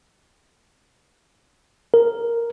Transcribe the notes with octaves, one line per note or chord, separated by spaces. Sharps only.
A#4